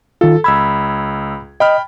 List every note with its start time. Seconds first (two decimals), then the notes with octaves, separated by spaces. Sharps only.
0.21 D#3 F4 A4
0.44 C#2 B5 E6 G#6
1.60 D#5 G5 B5 F6